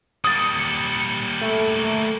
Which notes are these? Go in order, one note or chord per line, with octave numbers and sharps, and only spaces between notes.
G3 A#3 D#6 A6 C#7
A3